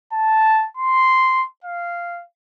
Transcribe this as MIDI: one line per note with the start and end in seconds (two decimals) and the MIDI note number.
0.13 0.66 81
0.77 1.44 84
1.64 2.22 77